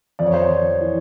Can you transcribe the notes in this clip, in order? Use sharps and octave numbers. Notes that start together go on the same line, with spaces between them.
F2 D5
C#5
C5
C#5
F2
E3